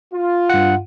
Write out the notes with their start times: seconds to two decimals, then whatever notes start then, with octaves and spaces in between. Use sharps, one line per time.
0.13 F4
0.49 G2 F#5